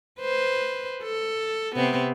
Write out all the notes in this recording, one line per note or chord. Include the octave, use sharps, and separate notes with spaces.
B4 C5
A4
C3 B3 C4